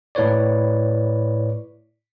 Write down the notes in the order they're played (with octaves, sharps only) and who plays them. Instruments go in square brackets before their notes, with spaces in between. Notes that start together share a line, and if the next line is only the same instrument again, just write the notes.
[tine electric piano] A2 E4 B4 C#5 D5